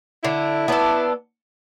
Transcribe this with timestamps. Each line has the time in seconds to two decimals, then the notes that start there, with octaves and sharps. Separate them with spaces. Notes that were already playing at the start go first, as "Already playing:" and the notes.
0.23 D3 E4
0.68 B3 D4 A4